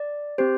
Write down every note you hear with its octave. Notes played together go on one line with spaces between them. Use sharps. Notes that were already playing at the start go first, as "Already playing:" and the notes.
Already playing: D5
C4 G4 C5